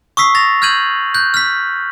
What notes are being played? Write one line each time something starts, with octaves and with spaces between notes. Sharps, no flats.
C#6 D#6 E6 B6 C7
A6 A#6 F7
F6 G6 G#6 D#7 F#7
F#6 G6
F6 B6